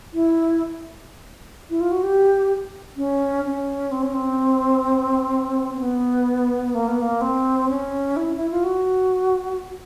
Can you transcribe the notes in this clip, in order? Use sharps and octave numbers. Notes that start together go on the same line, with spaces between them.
E4
E4
F4
F#4
G4
C#4
C#4
C4
C#4
C4
C4
B3
A#3
B3
A#3
C4
C#4
E4
E4
F4
F#4